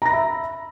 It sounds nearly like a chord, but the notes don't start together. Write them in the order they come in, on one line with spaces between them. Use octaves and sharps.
A#5 A#6 B5 E5